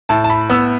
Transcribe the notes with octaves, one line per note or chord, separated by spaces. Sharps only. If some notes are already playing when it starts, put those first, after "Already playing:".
A2 A5
A5
B5
B3 E6